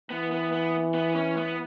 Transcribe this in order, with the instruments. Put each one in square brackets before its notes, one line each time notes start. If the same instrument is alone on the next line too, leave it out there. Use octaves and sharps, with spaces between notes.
[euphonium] E3 [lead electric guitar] B3
[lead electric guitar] B3
B3
B3
C#4
B3